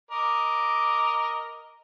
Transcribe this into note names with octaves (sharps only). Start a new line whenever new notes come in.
A#4 D#5 D6